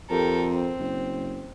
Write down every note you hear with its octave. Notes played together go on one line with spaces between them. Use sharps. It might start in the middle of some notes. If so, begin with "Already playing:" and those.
F2 G4 A4 A#4
C4
F#1